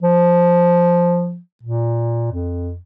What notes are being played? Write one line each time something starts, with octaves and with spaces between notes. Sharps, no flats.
F3
A#2
F2